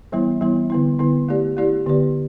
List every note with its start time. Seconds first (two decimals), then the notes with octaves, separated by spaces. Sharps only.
0.12 E3 G3 B3 E4
0.41 E3 G3 B3 E4
0.70 D3 B3 E4
0.99 D3 B3 E4
1.29 A3 E4 G4 D5
1.57 A3 E4 G4 D5
1.86 D3 B3 G4 B4 D5